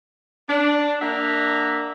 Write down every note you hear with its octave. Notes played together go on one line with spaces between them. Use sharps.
D4
A#3 D4 E5 F#5 A#5